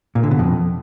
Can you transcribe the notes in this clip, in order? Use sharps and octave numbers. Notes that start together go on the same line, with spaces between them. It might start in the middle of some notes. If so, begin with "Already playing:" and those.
A#2
D3
B2
F2